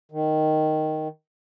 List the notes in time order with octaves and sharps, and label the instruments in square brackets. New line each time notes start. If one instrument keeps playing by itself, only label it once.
[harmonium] D#3